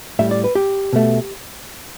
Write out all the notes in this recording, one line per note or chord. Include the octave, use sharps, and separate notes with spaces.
A2 G3 E5
D5
B4
G4
B2 A3